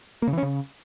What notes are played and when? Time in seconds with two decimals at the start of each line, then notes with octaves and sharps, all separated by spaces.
0.22 A#3
0.27 C#3
0.32 E3
0.38 C#4
0.43 C#3